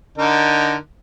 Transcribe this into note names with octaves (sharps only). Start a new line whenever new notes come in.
D3 D#4 A#4